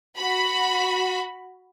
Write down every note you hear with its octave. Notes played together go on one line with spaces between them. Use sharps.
F#4 B5